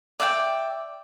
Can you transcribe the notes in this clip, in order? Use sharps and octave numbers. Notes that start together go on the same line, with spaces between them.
D5 E5 F#5 G5